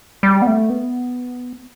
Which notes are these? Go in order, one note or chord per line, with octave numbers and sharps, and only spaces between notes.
G3
B3
A3
B3